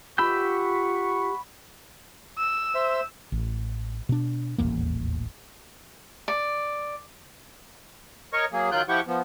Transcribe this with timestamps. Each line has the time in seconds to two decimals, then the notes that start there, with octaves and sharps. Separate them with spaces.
0.18 F4 G4 F#5 B5 C#6 E6 G6
2.38 E6
2.75 C5 E5
3.32 A1
4.09 B2 D4
4.58 D#1 A1 E2 A#3
6.28 D5
8.33 A#4 C#5 D#5 C#6
8.53 F#3 A#3 G#4
8.72 D#3 F#3 F4 G5 F#6 G6
8.89 F3 E4 G4 F#5 G5 C#6
9.07 F3 B3